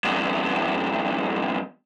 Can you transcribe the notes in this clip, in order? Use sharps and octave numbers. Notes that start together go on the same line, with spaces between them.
E2 G2